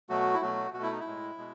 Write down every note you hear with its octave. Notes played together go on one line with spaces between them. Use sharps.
B2 F#3 A3 F#4
E4
B2 F#3 A3 F#4
B2 A3 E4 F#4
D#4
E4
A2 G#3
B2 G#3